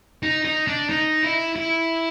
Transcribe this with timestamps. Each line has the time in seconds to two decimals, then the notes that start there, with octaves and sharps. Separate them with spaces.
0.23 D#4
0.45 D#4
0.67 D4
0.89 D#4
1.23 E4
1.56 E4